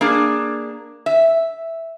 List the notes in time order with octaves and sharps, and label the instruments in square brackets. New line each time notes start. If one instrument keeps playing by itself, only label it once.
[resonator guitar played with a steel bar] A#3 D4 G#4
E5